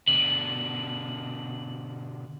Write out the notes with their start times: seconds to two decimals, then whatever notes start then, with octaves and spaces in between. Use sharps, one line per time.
0.07 B2 D3 F#7